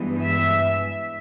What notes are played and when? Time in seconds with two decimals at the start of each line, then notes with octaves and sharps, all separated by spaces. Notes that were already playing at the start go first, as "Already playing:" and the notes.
Already playing: G2 E3 G#3 B3
0.23 E5